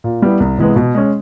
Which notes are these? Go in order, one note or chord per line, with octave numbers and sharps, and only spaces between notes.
A#2
G3 B3 E4
C2
C3 E3 G#3 B3
B2
G#3 C#4